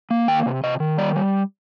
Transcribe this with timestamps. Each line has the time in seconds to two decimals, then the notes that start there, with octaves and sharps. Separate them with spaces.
0.11 A#3
0.28 D#3 G5
0.46 C3
0.64 C3 D#5
0.80 D#3
0.98 G3 D5
1.15 G3